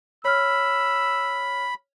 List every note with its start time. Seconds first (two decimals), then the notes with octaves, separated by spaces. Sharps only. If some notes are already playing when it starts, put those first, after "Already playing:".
0.25 C#5 B5 E6 F6